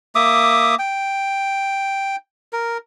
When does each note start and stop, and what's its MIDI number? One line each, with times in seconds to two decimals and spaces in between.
0.15 0.75 58
0.15 0.75 76
0.15 0.75 86
0.15 0.75 87
0.79 2.16 79
2.53 2.78 70